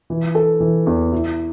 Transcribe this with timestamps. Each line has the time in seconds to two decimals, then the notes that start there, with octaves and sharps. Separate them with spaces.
0.10 E3
0.35 A4
0.60 E3
0.86 E2
1.13 E4